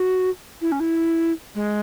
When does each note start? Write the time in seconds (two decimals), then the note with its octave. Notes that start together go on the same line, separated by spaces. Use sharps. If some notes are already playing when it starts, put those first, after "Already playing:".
Already playing: F#4
0.62 E4
0.72 C#4
0.80 E4
1.55 G#3